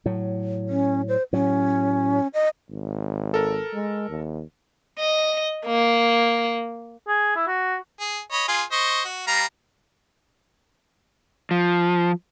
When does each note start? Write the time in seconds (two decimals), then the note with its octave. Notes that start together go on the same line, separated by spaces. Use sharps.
0.06 A2 F#3
0.69 C#4
1.08 C5
1.33 A2 F#3 C#4
2.34 D#5
2.70 G#1
3.34 A4 A#4
3.73 G#3
4.09 D#2
4.99 D#5
5.66 A#3
7.07 G#4
7.36 E4
7.47 F#4
8.00 G#4
8.32 C#5 D#5 B5
8.48 F4 G#4 G#5
8.72 C5 D#5 C#6
9.05 F#4
9.27 G3 F5 A#5
11.51 F3